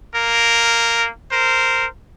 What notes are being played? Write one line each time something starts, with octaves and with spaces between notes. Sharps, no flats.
A#3 A#4
A#4 C5